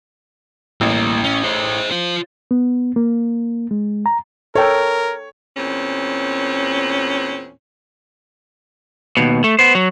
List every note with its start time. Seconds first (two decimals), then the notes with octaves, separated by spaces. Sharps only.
0.81 A1 G3 A#3
1.24 C#4
1.43 G#4 C5
1.91 F4 C5
2.51 B3
2.96 A#3
3.71 G#3
4.06 A#5
4.55 A4 A#4 C#5 G5
5.57 E2 A#2 C4 C#4
9.17 D#2 B2
9.44 A3
9.59 B3 C5
9.75 F#3